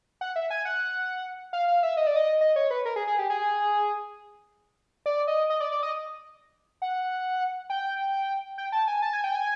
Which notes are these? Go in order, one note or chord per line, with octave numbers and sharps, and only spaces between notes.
F#5
E5
G#5
F#5
F5
F5
E5
D#5
D5
D#5
D#5
C#5
B4
A#4
G#4
G#4
G4
G#4
D5
D#5
D#5
D5
D5
D#5
F#5
G5
G5
A5
G#5
A5
G#5
G5
G#5